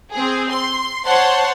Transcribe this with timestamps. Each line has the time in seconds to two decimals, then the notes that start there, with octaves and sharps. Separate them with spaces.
0.13 C4 G#4
0.51 C6
1.05 C5 C#5 F#5 A5 C6